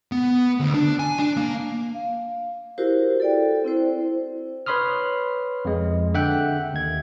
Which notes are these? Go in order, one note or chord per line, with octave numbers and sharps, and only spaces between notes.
B3
D2
D4
G#5
D4
A#3
F5
E4 F#4 G4 A#4 C5
A4 D5 G5
C4 E4 C5
B4 C#5 B5 C6 D#6 F6
F2 G#3
D3 E5 F#5 G5 F#6
D#2 G#6